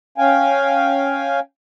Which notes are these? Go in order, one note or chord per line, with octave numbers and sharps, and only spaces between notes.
C#4 F5 G5 G#5